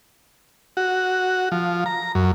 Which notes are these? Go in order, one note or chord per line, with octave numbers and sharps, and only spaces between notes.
F#4
F3
A#5
F#2